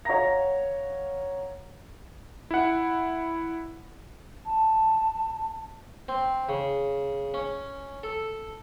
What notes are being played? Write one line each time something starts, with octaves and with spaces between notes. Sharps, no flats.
C#5 F5 F#5 A#5 A#6
E4 F#5
A5
C4
C#3
C#4
A4